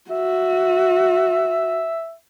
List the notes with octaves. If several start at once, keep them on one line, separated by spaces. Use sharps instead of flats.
F#4 E5